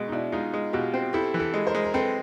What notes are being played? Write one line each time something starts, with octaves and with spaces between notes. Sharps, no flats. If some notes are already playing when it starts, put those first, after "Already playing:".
Already playing: B2 G#3
D#4
B2 D4 E4
G#3 D#4 F4
G#3
B2 F4 G4
C4
E4 G4 A4
E3
G4 A4
G#3
A#4 C5
G#3
A#4
C4 A4 B4